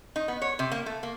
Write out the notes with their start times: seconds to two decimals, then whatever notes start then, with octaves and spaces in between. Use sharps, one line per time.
0.16 D#4
0.28 B3
0.42 C#5
0.59 C3
0.72 A#3
0.86 A3
1.03 A#3